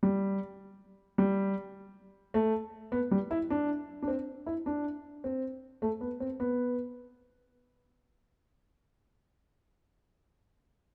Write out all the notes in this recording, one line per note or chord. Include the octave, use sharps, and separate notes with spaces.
G3
G3
A3
B3
G3
E4
D4
D4
C4
E4
D4
C4
A3
B3
C4
B3